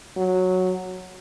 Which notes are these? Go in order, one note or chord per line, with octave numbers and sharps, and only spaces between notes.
F#3